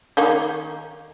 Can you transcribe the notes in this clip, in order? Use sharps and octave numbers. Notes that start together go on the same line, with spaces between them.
D#3 A#3 D#4